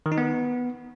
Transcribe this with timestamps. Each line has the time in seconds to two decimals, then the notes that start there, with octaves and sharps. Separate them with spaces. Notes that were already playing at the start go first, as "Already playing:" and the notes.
0.06 D#3
0.12 D#4
0.18 B3